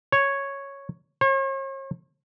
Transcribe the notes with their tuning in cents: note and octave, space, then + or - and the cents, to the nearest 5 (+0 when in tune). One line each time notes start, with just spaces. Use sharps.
C#5 -5
C#5 -45